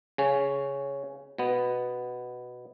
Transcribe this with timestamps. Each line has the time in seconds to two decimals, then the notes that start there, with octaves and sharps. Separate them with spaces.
0.18 C#3 C#4
1.38 B2 B3